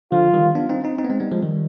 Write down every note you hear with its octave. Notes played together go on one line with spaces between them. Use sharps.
D3 F3 F4
D#3 G3
B3 D4
C4 D#4
C4 D#4
C4 D#4
B3
G#3 C4
G3 B3
F3 G#3
D#3 G3